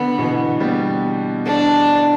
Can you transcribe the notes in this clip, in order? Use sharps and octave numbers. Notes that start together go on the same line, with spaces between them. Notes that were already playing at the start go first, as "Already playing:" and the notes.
Already playing: D3 B3
B2 E3
G3 B3
D4